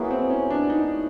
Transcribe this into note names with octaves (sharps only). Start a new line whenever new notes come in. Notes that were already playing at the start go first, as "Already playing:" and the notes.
Already playing: F#3 A#3 B3 E4 G#4
C4
C#4
D4
D#4